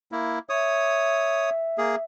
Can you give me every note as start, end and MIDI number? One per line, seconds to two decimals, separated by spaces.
0.12 0.39 58
0.12 0.39 64
0.49 1.50 73
0.49 2.04 76
0.49 1.50 87
1.78 1.96 58
1.78 1.96 68